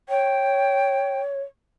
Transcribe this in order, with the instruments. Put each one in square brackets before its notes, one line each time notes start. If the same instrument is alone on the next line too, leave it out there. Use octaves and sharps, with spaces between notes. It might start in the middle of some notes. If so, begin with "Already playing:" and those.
[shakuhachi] C#5 [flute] G5